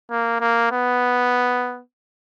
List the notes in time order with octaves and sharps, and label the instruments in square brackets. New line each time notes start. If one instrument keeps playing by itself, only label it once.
[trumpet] A#3
A#3
B3